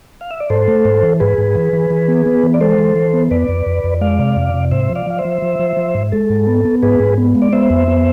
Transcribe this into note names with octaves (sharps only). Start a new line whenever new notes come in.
F5
E5
D5
G#2 A4 C5
A3
G#2
E3
G#2 G#4 B4
G#2
E3
E3
E3
B3
B3
E3
D5
G#3 A4 C5
E3
E3
B3
F2 B4 D5
F2
F2
F2
G#3 D5 F5
C3
F2
C3
G#2 C5 E5
F3
D5 F5
F3 F5
C5 E5
F3
F3
F3
F3
G#2
G#3 A4
G#2
B3
B3
G#2 G#4 B4
G#2
B3
G#3
D5
B3 C5 E5
F2
B3